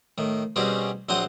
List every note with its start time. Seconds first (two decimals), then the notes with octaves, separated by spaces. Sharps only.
0.18 A2 D#3
0.56 B2 G3 C4 C#4 F#4 G#4
1.09 A#1 F#3 C4 C5 F#5 D#6